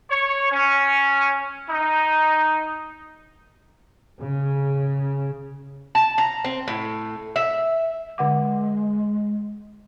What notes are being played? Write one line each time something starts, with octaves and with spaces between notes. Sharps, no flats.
C#5
C#4
D#4
C#3
A5
A#5
C4
A2
E5
D3 G#3 F#5 D6